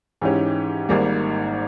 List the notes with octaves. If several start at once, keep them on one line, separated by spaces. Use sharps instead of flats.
G#2 E3 G#3 C#4 G4
G#1 G#2 G3 A#3